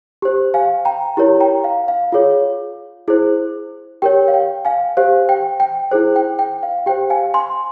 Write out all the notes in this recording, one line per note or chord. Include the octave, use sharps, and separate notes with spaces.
G4 C5
F5 G#5
G5 A#5
E4 G4 A#4 C#5
G5 A#5
F5
F5
F4 G#4 C#5
E4 G#4 C5
G4 A#4 C#5 G5
F5
G5
F5 G#5
G4 C5 F5
G5
G5
E4 G#4 C5
G5
G5
F5
G4 C5 G5
F5 G#5
G#5 C6